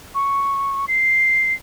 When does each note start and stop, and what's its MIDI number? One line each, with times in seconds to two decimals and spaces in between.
0.15 0.86 85
0.88 1.53 96